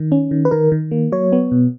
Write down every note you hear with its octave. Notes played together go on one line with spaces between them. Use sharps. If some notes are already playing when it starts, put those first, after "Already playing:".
Already playing: D#3
C#4
D#3
B4
D#3 A#4
D#3
A#3
F#3 C#5
B3
B2